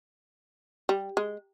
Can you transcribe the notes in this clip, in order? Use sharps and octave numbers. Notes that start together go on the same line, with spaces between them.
G3
G#3